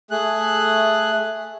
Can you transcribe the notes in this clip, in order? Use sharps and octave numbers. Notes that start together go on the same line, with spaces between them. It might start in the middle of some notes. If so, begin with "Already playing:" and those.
A3 G#4 F#6